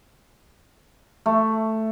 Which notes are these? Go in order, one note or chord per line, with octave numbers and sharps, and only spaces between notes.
A3